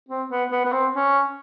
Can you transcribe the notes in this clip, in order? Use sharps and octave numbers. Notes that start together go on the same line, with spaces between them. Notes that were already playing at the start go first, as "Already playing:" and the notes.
C4
B3
B3
B3
C4
C#4